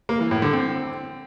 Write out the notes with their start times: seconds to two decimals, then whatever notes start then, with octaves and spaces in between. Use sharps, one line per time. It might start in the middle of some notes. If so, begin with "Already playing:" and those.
0.09 A#3
0.20 E3
0.31 A2
0.42 D3
0.53 C4